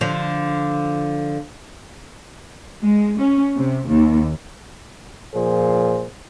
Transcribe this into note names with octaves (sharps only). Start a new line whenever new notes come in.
D3 F3
G#3
C#4
C3
D#2
A#2 F3 G#4 C5